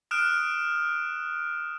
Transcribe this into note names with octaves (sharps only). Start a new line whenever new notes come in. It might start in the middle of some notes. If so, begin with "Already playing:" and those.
D#6 F6 F#6 D7 E7